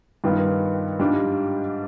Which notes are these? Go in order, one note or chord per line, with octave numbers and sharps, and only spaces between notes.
G2 D#3 B3 F4
G#2 G3 D4 F4